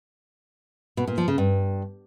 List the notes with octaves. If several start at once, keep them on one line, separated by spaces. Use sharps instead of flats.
B2
A#2
F3
C#3
G2